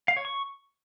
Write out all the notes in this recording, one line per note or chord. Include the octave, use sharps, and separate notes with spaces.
F5
C#5
C#6